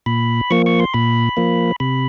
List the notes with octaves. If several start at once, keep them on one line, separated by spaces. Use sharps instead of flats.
A#2 B5
F3 A#3 C#6
C#6
C6
A#2 B5
F3 A#3
C3 B5